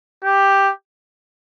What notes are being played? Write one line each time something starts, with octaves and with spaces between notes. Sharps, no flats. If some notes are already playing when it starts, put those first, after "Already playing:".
G4